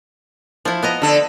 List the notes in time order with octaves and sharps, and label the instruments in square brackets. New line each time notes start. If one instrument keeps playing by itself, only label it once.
[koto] F3 E4
B3 D#5 A#5
[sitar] D3 A4